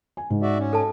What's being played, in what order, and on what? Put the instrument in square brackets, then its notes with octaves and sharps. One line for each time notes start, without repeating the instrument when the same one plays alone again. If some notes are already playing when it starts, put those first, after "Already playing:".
[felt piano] G#5
G#2
[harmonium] F#4 D5 E5
C#4
[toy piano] A4 A5